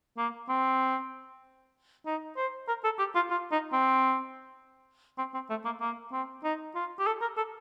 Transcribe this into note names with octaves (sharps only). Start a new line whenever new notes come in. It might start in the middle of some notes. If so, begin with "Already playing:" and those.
A#3
C4
D#4
C5
A#4
A4
G4
F4
F4
D#4
C4
C4
C4
A3
A#3
A#3
C4
D#4
F4
G4
A4
A#4
A4